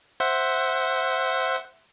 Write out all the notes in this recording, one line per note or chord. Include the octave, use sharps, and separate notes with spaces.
C5 E5 F#5